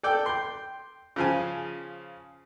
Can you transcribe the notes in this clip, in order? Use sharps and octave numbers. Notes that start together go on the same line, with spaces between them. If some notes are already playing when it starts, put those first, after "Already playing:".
A4 D5 G5
G5 C6
C#3 F3 G#5